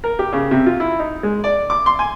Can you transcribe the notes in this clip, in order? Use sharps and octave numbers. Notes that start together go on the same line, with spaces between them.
A#4
G4
C#3
C3
F4
E4
D#4
G#3
D5
D6
C6
G#5